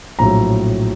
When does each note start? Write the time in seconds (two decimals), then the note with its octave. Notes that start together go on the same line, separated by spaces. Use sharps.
0.19 A#1 A2 F#3 A#5